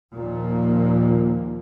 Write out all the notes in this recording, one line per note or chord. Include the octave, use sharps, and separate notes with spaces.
D#2 A#2 F3 A#3